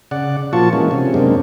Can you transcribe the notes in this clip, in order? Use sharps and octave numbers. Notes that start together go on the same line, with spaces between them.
C#3 D5 F#5
A#2 F3 F4 F#4 A5 C#6
E3 G#3 A#3 C#4
C3 C#4
F#2 G#3 A#3 C4 D4